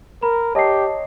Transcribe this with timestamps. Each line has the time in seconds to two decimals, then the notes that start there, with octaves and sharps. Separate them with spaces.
0.22 A#4 A#5 B5
0.55 G4 C#5 D#5 A5 C7